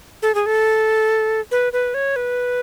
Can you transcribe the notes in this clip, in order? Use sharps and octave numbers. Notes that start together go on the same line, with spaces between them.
A4
G#4
A4
B4
B4
C#5
B4